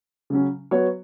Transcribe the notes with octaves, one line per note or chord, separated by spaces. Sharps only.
C#3 F#3 C#4
F#3 B3 F#4 C#5